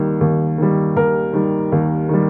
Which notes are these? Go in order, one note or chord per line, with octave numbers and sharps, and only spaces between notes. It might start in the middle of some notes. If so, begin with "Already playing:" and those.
Already playing: D#2 D#3 G3
D#2
D#3 G3
D#2 A#4
D#3 G3
D#2
D#3 G3